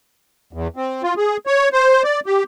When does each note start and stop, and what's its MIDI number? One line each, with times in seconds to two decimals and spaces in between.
0.53 0.68 40
0.76 1.02 60
1.03 1.14 65
1.17 1.37 68
1.47 1.69 73
1.73 2.03 72
2.04 2.20 74
2.26 2.43 67